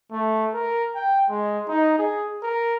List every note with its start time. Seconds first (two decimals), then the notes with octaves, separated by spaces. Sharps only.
0.12 A3
0.54 A#4
0.95 G5
1.29 G#3
1.68 D#4
1.98 G#4
2.43 A#4